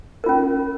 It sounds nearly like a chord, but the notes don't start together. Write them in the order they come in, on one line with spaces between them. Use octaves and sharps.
A#4 F4 C#4